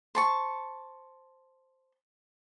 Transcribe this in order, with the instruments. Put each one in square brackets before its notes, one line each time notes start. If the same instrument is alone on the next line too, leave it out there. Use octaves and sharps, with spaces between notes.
[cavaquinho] C5 A5 C#6